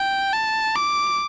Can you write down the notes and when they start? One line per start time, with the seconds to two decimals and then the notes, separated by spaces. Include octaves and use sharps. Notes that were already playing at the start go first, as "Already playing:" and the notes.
Already playing: G5
0.33 A5
0.76 D6